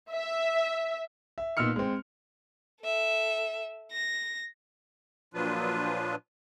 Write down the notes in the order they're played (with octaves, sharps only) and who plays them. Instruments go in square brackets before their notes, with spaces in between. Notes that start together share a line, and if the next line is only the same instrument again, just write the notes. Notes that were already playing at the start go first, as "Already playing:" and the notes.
[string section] E5
[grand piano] E5
A#2 B3 D#4 E6 F6 C#7
G#3 C4
[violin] A4 E5
A#6
[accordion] A#2 F3 F#3 D4 F4 B4